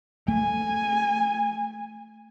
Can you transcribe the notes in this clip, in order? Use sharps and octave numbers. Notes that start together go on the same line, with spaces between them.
A3 G#5